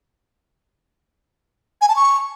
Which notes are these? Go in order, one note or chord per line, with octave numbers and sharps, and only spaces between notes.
G#5
A5
C#6